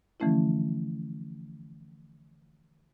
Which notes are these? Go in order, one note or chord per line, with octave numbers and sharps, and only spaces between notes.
D3 E3 F3 A3 C#4 E4